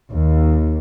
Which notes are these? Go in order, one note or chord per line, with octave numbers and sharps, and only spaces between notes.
D#2